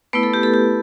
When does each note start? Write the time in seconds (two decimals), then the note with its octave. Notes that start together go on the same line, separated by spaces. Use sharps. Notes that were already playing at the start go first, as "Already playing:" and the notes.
0.13 A3 B3 E4 B4
0.23 A4
0.34 G4
0.43 A4
0.54 G4